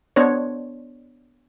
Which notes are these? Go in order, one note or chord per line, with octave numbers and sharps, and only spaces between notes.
B3 D4 C5 C#5